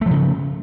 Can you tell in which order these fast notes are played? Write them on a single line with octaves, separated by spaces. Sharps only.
A3 F3 C#3